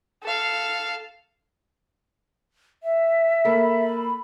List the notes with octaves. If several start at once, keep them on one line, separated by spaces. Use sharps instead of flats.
A4 F5
E5
A#3 A4 B5